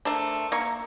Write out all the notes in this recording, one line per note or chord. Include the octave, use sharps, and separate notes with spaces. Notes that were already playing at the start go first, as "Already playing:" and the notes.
A3 D4 A#4 C5
A#3 A#5 C#6